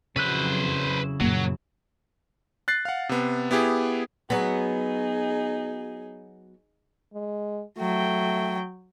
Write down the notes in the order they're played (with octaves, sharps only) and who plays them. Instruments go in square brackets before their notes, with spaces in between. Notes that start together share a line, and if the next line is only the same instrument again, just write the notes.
[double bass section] F2 F#3 [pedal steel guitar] C#3 E4 F#6 [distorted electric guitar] B4 C5
[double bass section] F#2 [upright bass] A#2 A#3 [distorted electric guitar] F#3
[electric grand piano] F#6 A6 C7
F5 F#5
C3 B3
B3 E4 G4 G#4
[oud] F#3 B3 [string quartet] D#4 G#4
[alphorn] G#3
[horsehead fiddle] F#3 G5 [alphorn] A3